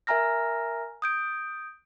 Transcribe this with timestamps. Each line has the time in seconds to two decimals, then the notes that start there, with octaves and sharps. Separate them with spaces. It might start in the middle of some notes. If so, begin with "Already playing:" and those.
0.07 A#4 E5 G#5 A#5 F6 A#6
1.02 D#6 G6 D7